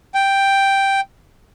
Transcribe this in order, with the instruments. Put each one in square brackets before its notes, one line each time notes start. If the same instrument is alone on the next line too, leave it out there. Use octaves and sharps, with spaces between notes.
[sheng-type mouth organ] G5